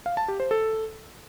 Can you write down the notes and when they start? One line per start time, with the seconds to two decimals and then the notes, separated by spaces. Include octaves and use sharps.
0.06 F5
0.17 A5
0.28 G4
0.40 C5
0.51 A4